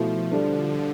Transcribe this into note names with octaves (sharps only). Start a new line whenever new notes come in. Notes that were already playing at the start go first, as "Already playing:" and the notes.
Already playing: B2 F3 A3 E4
D3 G3 D4 A4